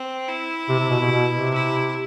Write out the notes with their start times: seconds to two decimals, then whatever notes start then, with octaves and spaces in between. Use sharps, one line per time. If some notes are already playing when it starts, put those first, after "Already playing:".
Already playing: C4
0.28 E4
0.69 C3
0.80 C3
0.90 B2
1.00 B2
1.11 B2
1.32 C3
1.54 E4